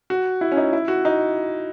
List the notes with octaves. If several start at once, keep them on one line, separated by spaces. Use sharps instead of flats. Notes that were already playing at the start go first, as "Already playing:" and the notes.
F#4
E4
C#4
D#4
E4
F#4
D#4